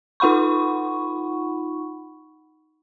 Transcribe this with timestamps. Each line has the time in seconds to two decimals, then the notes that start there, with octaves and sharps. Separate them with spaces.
0.20 D#4 F4 F#5 B5 C#6